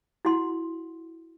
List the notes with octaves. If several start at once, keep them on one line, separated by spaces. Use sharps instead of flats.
E4 F#4 F#5 C6